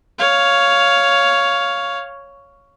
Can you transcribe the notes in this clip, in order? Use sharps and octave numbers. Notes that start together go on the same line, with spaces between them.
C#5 F5